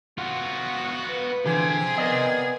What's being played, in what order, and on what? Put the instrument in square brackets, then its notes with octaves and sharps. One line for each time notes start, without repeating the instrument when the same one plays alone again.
[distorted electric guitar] B3 F4 [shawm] F#4
[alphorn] B4
[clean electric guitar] D3 E3 F3 [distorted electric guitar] G4 C5 [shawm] G#4
[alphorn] B3 [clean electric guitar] A#4 D5 D#5